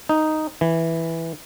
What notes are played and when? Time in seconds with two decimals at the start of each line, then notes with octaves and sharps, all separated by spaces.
0.09 D#4
0.61 E3